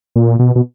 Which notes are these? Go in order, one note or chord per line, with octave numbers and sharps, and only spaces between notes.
A#2
B2
B2